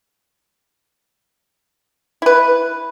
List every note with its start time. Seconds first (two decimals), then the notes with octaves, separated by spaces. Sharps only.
2.22 E4 B4